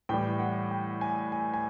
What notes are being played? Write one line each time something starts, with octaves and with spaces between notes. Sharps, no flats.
A2 E3 G3 G5
F#5
G5
G#5
G#5
G#5